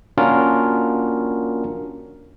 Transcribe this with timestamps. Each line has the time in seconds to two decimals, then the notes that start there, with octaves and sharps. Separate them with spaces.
0.18 A#3 C#4 D4 F4 F#4 A#4